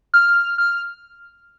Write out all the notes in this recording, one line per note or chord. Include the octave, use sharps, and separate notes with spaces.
F6
F6